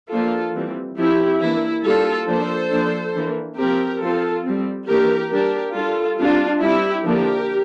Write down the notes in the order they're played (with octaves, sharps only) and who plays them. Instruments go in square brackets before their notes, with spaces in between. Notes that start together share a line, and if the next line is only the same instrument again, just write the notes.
[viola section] F3 A#3 D4 F4 A4
E3 G3 C4
F3 C4 E4 G4
E3 A#3 D4 E4
G3 A#3 D4 F4 A4
F3 A#3 D4 A4 C5
F3 A#3 D4
E3 A#3 D4
F3 C4 G4 A#4
F3 C4 F4 A4
G3 C4
E3 A#3 D4 G4 A#4
G3 D4 G4 A#4
G3 D4 F4 A4
G3 C4 D4 F4
G3 C4 E4 G4
D3 F3 A#3 D4 G4 A#4